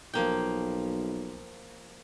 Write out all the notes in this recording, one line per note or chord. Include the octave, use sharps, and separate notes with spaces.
B1 F3 A#3 G5